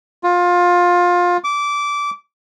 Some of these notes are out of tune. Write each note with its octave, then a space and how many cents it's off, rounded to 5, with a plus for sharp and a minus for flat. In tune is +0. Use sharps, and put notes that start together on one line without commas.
F4 +20
D6 -15